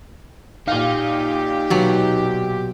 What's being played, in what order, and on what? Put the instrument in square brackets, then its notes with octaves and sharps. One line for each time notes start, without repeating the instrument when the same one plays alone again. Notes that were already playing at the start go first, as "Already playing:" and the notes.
[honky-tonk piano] A#2 F5 [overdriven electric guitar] D#4 [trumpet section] G4
[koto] B2 F#3